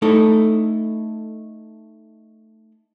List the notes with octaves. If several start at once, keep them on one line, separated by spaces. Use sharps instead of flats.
A3 D#4 E4 A4